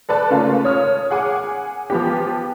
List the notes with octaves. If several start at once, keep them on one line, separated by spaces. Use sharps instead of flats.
A4 B4 D5 A5
C#3 A3 A#3 C#4 F4
C#5 D#6 F6
G#4 F#5 G#5 D6
F3 B3 G4